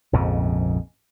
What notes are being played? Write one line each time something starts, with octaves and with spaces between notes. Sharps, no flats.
A#1 F2 G#2 C#3